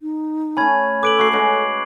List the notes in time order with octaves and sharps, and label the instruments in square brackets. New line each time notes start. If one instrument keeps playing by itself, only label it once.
[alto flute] D#4
[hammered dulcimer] A3 C#4 [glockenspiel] G#5 B5 G#6
[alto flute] A4 [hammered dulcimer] B4 [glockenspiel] D6 D7 F#7
[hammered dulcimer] A3 F#4 [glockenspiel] C#6 C7
[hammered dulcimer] G#3 C#4 F#4 [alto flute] A4